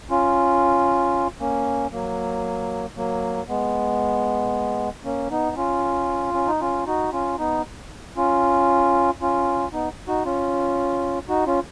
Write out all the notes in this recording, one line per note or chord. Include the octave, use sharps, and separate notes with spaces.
C#4 F4
A#3 C#4
F#3 A#3
F#3 A#3
G#3 B3
A#3 C#4
B3 D#4
C#4 F4
C#4
D#4
C#4 F4
D#4 F#4
C#4 F4
B3 D#4
C#4 F4
C#4 F4
B3 D#4
D#4 F#4
C#4 F4
D#4 F#4
C#4 F4